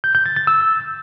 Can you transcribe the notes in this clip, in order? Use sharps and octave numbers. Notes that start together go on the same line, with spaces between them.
G6
G6
A6
A6
E6